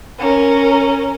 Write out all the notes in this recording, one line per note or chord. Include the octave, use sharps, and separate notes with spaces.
C#4 A#4